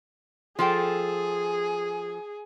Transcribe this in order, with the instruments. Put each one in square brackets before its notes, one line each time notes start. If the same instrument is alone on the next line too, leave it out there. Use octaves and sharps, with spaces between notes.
[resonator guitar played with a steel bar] F3 A4 G5 [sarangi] G#4